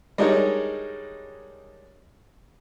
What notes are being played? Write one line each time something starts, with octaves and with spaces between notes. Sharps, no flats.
G3 G#3 D4 D#4 A#4 C#5